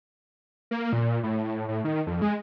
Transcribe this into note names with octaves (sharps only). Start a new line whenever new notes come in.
A#3
A#2
A2
A2
A2
D#3
F2
G#3